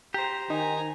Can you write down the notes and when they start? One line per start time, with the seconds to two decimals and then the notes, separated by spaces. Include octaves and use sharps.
0.14 G4 C5 A#5
0.50 D#3 D#4 G#5 A#5